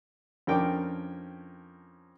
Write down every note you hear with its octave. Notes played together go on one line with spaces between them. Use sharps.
F2 C#4 D4 A#4 G5 D6